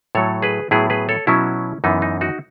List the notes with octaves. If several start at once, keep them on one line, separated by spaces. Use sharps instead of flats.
A2 F#3 A3 A4 C#5
G#4 B4
A2 F#3 B3 E4 G#4
G#4 B4
A4 C#5
B2 F#3 B3 C#4 E4
F#2 E3 B3 D#4
D#4
D#4 F#4